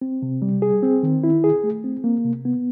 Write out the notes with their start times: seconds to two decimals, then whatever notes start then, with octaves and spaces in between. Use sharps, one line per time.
0.01 C4
0.22 C3
0.42 G3
0.62 G#4
0.83 C4
1.03 D#3
1.24 E4
1.44 G#4
1.64 A3
1.84 C4
2.04 A#3
2.24 C3
2.45 B3